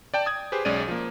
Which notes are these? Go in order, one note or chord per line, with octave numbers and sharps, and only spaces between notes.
D5 G5 A5
D#6 G#6
G4 G#4 B4 C5
B1 G#3 C#4 D5 D#7
F3 A#3